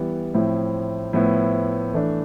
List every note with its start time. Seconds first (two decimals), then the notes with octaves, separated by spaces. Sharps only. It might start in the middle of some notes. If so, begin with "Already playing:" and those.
Already playing: E3 G3 B3 E4
0.34 A2 F3 C4 E4
1.13 A2 F3 B3 E4
1.94 E3 A3 D4